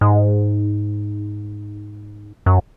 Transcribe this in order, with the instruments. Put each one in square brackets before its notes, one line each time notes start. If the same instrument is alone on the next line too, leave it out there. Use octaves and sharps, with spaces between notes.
[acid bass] G#2
F#2